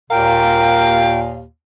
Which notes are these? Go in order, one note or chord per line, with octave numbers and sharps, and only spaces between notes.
D#2 A#2 A#4 F5 G5